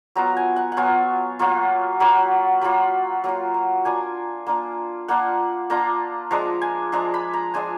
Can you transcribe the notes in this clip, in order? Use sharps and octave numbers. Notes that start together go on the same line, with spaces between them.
F#3 B3 F4 A#5
G#5
F#5
F#5
F#3 B3 F4 G#5
F#3 A#3 F4
F#3 A#3 F4 B5
F#3 A#3 F4 B5
F#3 A#3 F4 A#5
A#5
A#3 D4 F4 G#5
A#3 D4 F4
A#3 D4 F4 F#5
A#3 D4 F4 A#5
F3 G#3 D4 A#5
G#5
F3 G#3 D4 A#5
B5
A#5
F3 G#3 D4 G#5